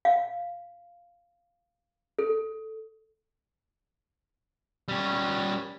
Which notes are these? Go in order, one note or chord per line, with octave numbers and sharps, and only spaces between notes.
F5
A4
G3 C#4